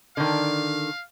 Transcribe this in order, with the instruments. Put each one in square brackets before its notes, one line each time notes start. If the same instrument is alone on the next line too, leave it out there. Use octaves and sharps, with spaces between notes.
[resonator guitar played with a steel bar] D3 D#3 [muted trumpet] F5